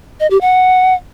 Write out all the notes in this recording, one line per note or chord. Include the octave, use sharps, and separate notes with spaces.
D#5
G4
F#5